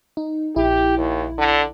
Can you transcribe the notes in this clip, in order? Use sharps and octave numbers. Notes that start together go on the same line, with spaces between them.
D#4
A#1 E4 G4
D#2
D3